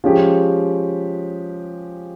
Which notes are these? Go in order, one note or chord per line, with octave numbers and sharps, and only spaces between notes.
F3 G#3 C#4 G4